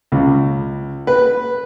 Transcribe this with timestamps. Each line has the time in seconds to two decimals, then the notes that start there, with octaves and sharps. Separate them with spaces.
0.12 C#2
1.07 B4